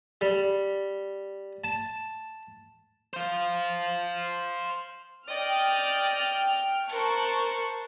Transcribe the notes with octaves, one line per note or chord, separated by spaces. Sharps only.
G3
A5
C5 F5
D5 D#5 G5 F6
A#4 C5 A5 C#6 F#6